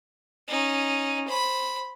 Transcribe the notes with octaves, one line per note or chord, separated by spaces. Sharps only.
C#4 D#4
C5 B5